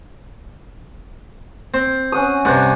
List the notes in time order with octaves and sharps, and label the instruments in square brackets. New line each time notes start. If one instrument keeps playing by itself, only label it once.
[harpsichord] C4
[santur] C#4 F#5 D#6
[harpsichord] G2 C3 [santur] F#5